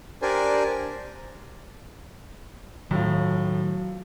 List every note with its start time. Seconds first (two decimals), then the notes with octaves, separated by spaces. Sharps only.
0.22 D4 G4 A#4 C5 D5 G#5
2.91 A2 D#3 F#3 A3 F4